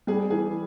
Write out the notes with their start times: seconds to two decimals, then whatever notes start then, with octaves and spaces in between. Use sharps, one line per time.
0.07 G3 G#4
0.30 E3 G#4